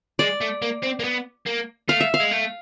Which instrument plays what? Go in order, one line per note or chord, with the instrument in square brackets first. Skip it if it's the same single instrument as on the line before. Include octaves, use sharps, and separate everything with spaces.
[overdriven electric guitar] G#3 [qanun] D5
[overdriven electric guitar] A3
A#3
C4
A#3
B3
A#3
[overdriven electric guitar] A3 [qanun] F5
[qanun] E5
F5
[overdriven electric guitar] G#3
A3